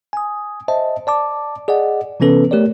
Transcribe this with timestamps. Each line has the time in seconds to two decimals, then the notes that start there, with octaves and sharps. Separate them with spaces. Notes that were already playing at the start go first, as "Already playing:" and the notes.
0.13 G#5 D#6
0.68 C5 D#5 E5 A5
1.07 D5 A5 D6
1.68 G#4 D5 D#5 F#5
2.20 C3 E3 B3 C#4 A4 B4
2.51 A3 G4 A#4 C#5 D5